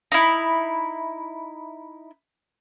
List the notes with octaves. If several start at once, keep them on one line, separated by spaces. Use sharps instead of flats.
D#4 E4